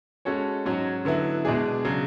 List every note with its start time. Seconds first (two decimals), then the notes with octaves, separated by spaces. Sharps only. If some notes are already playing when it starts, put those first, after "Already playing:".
0.25 G#3 C#4 F#4 A4 C#5
0.65 G#2 F#3 C#4 F#4 C#5
1.05 D3 F#3 B3 E4
1.45 B2 G#3 D4 G#4
1.85 C#3 F#3